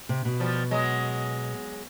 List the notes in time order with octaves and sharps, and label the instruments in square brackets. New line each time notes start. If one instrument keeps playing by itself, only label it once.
[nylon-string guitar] C3
B2
[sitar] F3 G3
F#3 G#3